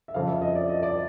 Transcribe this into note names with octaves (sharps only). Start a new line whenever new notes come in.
E5
F2 C#3 F3 F5
E5
D#5
D5
D#5
D5